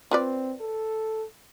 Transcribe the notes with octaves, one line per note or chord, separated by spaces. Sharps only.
C4 F4 B4 D5
A4